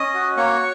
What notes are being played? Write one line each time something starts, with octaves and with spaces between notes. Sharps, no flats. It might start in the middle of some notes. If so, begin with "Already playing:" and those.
Already playing: C#4 D#5 D#6
F#4
A#3 C#5 C#6